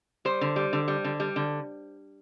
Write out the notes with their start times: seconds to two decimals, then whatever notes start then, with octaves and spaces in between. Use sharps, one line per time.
0.25 G3 C5
0.41 D3
0.56 G3
0.73 D3
0.88 G3
1.04 D3
1.20 G3
1.36 D3